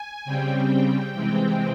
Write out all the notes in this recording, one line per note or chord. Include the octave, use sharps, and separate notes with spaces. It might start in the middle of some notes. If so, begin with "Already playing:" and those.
Already playing: G#5
C#3 G3 C4 G5
C3 E3 G#3 C4 G5